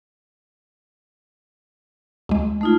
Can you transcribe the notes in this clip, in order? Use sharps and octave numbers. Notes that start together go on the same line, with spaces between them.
D2 G#3
A3 D#4 F4